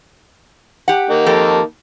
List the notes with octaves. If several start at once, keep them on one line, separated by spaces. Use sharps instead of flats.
G4 F#5
A#3 D#4
F2 G4 A4